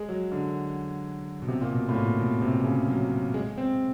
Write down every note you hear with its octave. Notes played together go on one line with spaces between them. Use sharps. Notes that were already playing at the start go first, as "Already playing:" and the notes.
Already playing: G#3
F#3
D3
B2
C3
A#2
B2
A2
A#2
B2
C3
C#3
F#3
G#3
C4